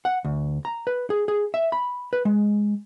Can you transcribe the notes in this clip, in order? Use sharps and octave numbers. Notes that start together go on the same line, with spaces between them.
F#5
D2
A#5
B4
G#4
G#4
E5
B5
B4
G#3